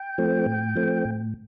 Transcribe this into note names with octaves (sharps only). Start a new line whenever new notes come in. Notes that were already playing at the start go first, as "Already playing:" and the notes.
Already playing: G5
F3 A3 C4
A2
F3 A3 C4
A2